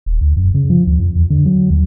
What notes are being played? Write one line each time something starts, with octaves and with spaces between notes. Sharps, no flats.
D#1
D2
F#2
C#3
F3
D2
F2
E2
D3
F#3
D#2